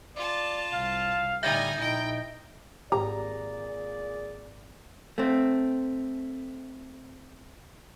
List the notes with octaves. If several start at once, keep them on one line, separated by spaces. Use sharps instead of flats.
F4 D5 A5
C2 F5
A2 D3 G3 D#4 E5 G#5 G6 A#6
A#1 D#4 E4 G5
G#1 A#2 G4 G#4 D5 A#5
A3 C4